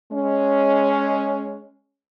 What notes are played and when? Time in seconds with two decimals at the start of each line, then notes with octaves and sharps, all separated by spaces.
0.13 G#3 C#4